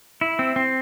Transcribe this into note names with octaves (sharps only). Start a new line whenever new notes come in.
E4
C4
C4